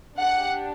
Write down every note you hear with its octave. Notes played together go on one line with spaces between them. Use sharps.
D4 G4 F#5